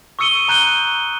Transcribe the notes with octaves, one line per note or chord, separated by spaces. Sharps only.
C#6 D#6 E6 C#7 D#7 G7
A#5 F#6 G6 D#7 G7